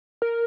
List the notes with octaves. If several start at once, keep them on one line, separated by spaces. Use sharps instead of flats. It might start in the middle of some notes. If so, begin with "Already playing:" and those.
A#4